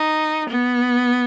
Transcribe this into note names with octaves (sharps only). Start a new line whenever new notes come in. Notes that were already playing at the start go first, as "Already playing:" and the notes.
Already playing: D#4
B3